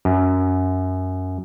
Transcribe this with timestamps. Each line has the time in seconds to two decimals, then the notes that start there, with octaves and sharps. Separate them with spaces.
0.05 F#2